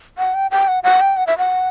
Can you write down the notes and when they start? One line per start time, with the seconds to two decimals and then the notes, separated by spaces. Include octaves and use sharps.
0.18 F#5
0.34 G5
0.51 G5
0.68 F#5
0.84 F#5
1.01 G5
1.17 F#5
1.27 E5
1.38 F#5